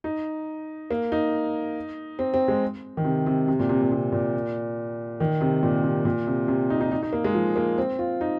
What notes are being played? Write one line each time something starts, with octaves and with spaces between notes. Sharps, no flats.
D#4
A#3
D#4
C4
C4
G#3
D#3
C3
C3
C3
A#2
C3
A#2
C3
A#2
D#3
C3
A#2
C3
A#2
C3
C3
D#4
D#4
D#4
D#4
A#3
G#3
F3
A#3
C4
F4
D#4